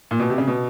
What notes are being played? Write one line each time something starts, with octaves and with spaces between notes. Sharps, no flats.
A#2
B2
C3
C#3
B2